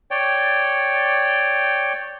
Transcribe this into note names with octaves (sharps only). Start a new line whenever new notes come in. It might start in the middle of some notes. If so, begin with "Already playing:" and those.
C#5 D5 G5